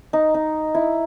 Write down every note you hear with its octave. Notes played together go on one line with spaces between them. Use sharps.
D#4
D#4
E4